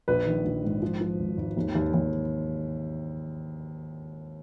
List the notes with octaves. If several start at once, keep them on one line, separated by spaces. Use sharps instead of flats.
A#1 B4
D#3
A#1
G#2
F3
F3
G#1
G#1
D#2
D#2
D#2